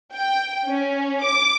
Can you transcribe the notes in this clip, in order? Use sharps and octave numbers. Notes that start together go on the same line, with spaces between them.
G5
C#4
D6